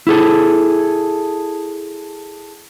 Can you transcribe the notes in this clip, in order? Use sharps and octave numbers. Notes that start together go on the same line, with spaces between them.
E4 G#4 A4